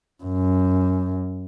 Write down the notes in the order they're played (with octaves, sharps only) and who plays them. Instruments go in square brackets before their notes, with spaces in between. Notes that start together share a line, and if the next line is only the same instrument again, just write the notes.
[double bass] F#2